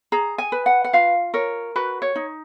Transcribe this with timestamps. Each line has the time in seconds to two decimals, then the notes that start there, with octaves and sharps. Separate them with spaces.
0.12 G#4 A#5
0.38 G#5
0.52 B4
0.66 F#5
0.84 F#5
0.93 F4 F5
1.34 A#4 C#5
1.76 F#4 B4
2.02 C#5
2.16 D#4